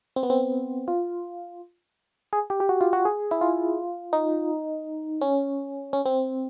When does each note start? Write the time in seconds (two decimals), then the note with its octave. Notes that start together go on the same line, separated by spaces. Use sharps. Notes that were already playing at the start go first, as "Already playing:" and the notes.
0.16 C4
0.23 B3
0.30 C4
0.88 F4
2.33 G#4
2.50 G4
2.60 G4
2.69 F#4
2.81 F4
2.93 F#4
3.05 G#4
3.31 E4
3.41 F4
4.13 D#4
5.21 C#4
5.93 C#4
6.06 C4